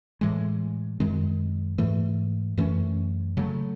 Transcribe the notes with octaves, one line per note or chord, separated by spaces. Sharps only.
A2 E3 G#3
F#2 D#3 G#3 C4
G#2 E3 A3
F#2 E3 A3 C#4
C#3 F#3 A3